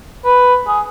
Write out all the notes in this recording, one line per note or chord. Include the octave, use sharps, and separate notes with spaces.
B4
G#4